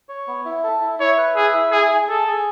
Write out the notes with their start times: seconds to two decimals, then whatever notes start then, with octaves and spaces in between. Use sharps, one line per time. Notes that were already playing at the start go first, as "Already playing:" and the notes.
0.09 C#5
0.27 B3
0.45 E4
0.64 A4
0.81 E4
0.99 E4 C#5
1.17 B4
1.35 G#4 E5
1.54 E4
1.72 G#4 G#5
1.90 G#4
2.08 G#4 A4
2.27 G#4